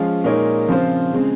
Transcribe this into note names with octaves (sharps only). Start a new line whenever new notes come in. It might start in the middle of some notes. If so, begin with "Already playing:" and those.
Already playing: F3 G#3 C#4 F4
A#2 G#3 D#4 A#4 C#5
C#3 F3 C4 F4 C5
C#3 G#3 C4